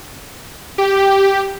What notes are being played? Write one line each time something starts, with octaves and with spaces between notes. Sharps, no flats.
G4